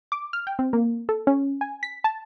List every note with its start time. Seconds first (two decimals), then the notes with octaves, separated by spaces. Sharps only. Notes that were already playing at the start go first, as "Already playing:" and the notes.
0.12 D6
0.33 F6
0.47 G5
0.59 C4
0.73 A#3
1.09 A4
1.27 C#4
1.61 G#5
1.83 B6
2.04 A5